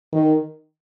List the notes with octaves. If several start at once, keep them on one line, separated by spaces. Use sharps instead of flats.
D#3